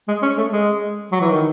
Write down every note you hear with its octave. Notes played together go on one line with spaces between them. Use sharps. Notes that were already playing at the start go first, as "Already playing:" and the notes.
G#3
C#4
A3
G#3
F#3
E3
D#3